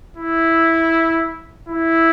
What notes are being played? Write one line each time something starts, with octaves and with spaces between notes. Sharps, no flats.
E4
E4